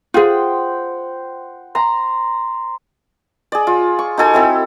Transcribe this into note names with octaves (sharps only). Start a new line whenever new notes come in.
F4 G#4 C5 F#5 G5
A#5 C6
G#4 D5
F4
C#6
D#4 F#4 A4 G#5
C4 E4 A4